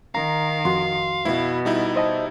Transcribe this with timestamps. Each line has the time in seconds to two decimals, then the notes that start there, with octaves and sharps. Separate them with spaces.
0.15 D#3 F5 A#5
0.65 F2 F#4 C6
1.25 B2 E4
1.65 G3 D#4 E4
1.96 C5 D#5 A5